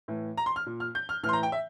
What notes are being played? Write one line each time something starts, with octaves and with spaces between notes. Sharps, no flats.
A2 E3
A#5
C6
F6
A#2
F6
G6
F6
A2 E3 F6
C6
A#5
G5
E5